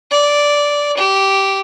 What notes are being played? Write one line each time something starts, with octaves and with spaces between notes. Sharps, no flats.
D5
G4